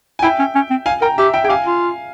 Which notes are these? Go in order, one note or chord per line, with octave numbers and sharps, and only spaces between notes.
G#5
E4 E5 G5
C#4
C#4
C4
F5 G#5
A#4 G5 A#5
G4 E5
E5 G5
G#4 G5
G4 F5 G#5
F4